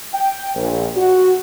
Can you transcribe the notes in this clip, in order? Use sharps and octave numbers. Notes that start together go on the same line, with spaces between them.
G5
A#1
F#4